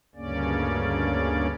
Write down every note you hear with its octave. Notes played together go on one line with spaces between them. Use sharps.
D2 G2 C#3 A#3 C#4 D5